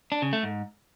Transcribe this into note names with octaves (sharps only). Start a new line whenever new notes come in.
D4
C#3
A3
G#2